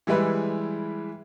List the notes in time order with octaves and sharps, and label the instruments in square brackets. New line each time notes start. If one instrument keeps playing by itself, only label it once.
[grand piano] E3 G3 G#3 E4 B4